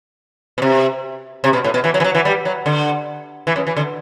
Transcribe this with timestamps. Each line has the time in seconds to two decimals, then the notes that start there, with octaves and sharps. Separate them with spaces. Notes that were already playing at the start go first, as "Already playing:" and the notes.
0.58 B2
0.62 C3
1.44 C3
1.53 B2
1.64 A2
1.74 B2
1.84 E3
1.94 F#3
2.00 E3
2.04 F#3
2.15 E3
2.25 G3
2.45 F#3
2.66 D3
3.47 E3
3.56 F#2
3.67 E3
3.77 D3